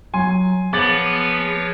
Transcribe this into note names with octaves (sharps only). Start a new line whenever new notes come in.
F#3 G#5 C6
F3 B3 G#4 B4 C#5 D6 A6 F#7